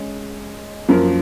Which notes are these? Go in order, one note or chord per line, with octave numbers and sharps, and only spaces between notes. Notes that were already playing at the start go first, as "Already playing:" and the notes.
Already playing: G#3 C#4
F#2 F3 A#3 F4